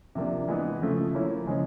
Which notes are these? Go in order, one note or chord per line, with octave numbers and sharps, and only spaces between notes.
C3 F3 A#3 D4
E3 G#3 B3 E4
C#3 F3 A3
F3 A#3 C#4 E4
C#3 F3 G#3 C#4